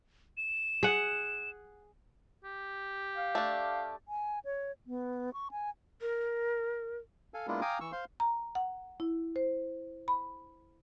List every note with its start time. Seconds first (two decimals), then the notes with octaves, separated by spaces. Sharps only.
0.37 E7
0.83 G#4 F#5
2.44 G4
3.15 F5
3.35 A3 D4
4.08 G#5
4.45 C#5
4.87 B3
5.33 C#6
5.51 G#5
6.01 A#4
7.34 A4 F5 G#5
7.47 G#3 A#3 B3 D4 E4 F4
7.61 F5 G5 G#5 A#5 D6 D#6
7.81 E3 C#6 E6
7.92 C5 F5 C6
8.20 A#5
8.55 F#5
9.00 E4
9.36 C5
10.08 B5